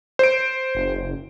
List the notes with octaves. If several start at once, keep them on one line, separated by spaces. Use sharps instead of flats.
C5 D7
F#1